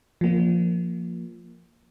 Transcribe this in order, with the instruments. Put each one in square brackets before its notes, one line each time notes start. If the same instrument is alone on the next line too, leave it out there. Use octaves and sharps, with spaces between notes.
[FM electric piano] F3 A#3